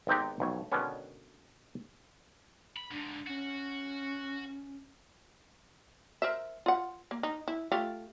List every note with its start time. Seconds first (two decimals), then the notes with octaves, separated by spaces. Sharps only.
0.07 G#1 B3 C4 D#4 G4
0.40 B1 F2 C#5
0.72 B2 D3 D#3 G#3 B3 C#4
2.76 B5
2.91 G#2 D3 D4
3.27 C#4 F#4
6.22 A#4 C5 E5
6.66 F4 F#5
7.11 A#3
7.23 D#4
7.48 E4
7.72 A3 F4 G4